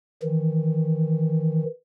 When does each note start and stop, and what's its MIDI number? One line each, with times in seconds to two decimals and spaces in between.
0.23 1.64 51
0.23 1.64 52